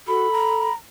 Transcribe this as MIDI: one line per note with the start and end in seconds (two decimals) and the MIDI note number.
0.08 0.28 66
0.08 0.68 69
0.08 0.73 83
0.32 0.73 82